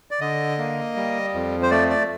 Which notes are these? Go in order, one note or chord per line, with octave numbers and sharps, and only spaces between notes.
D5
D3 D#5
A#3
G3
F2
C5
A3 D5
D5